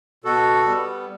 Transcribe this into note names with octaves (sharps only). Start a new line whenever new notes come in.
B2 F#4 A4
G3 B3